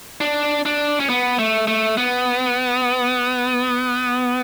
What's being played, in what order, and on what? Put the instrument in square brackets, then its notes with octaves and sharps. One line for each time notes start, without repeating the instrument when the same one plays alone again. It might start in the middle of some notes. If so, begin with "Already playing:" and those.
[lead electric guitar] D4
D4
C#4
B3
A3
A3
B3